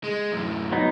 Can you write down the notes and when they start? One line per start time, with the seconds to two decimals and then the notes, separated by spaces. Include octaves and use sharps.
0.04 G#3
0.33 F#2 A2
0.72 F#3 B3 D#4